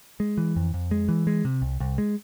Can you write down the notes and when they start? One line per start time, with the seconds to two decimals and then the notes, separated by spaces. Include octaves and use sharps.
0.20 G#3
0.38 E3
0.56 F2
0.74 F2
0.91 G#3
1.09 E3
1.27 G#3
1.45 C3
1.62 C2
1.80 C2
1.98 G#3